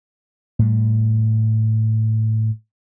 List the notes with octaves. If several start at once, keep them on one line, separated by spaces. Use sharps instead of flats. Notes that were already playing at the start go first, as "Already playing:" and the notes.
A2 G3